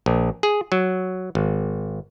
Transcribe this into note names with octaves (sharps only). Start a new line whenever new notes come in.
A#1
G#4
F#3
G#1